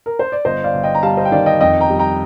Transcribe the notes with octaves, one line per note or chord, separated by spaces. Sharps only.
A#4
C5
D5
G1 C5 D#5
D5 F5
G1
D#5 G5
A#5
G3 F5 A5
C5 D#5
G5
D#3 D5 F5
D#5 G5
F2 D#5 G5
G5 A#5
G3
G5 A#5